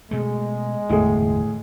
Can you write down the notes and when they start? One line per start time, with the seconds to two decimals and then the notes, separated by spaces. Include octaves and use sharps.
0.11 B2 G#3 A3
0.89 G1 E2 A2 E3 G#4